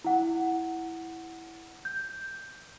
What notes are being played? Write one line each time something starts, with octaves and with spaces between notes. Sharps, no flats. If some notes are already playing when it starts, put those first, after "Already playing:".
E4 F#5
G6